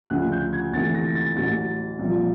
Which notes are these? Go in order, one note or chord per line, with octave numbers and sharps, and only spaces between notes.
D2 C#3 F3 F#6
G6
G#6
D2 C3 E3 A3 A6
A#6
A6
A1 A2 F#3 A6
C2 A#2 F3